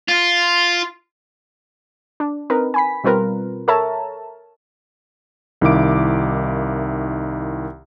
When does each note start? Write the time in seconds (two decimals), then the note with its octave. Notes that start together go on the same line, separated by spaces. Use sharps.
0.08 F4
2.20 D4
2.50 C4 D#4 A#4 B4
2.74 G#5 B5 B6
3.04 B2 G3 C4 F4 A#4 B4
3.68 A4 A#4 C#5 E5 A5 A#5
5.61 C2 D#3 E4 F5 D6 D7